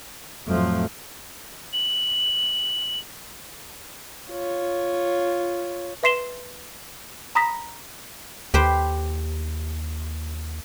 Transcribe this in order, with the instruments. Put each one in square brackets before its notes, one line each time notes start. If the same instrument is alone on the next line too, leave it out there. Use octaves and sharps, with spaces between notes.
[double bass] F2 F3 [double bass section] A2 F#3 A3
[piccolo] F#7
[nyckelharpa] F4 C#5
[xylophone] B4 E5 C6 C7 E7 G7
A#5 B5 D#6 A#6 B6
[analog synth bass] D#2 [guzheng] G4 B4 C5